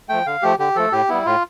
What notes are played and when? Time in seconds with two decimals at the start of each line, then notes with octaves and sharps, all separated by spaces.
0.09 F3 A3 G5
0.26 D3 F5
0.43 F3 A3 G4
0.59 D3 G4
0.76 F3 A3 A4
0.92 A2 G4
1.09 G3 B3 E4
1.26 A2 F4